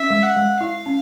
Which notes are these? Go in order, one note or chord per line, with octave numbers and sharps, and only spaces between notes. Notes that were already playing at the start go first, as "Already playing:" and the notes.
Already playing: C#4 E5
G#3
F#5
G#3
E4 F5
C#4